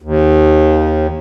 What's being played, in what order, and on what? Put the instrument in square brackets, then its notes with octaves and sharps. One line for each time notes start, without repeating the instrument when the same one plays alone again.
[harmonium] D#2